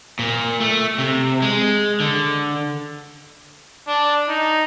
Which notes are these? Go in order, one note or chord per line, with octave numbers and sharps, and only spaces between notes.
A#2
A3
C3
G#3
D3
D4
D#4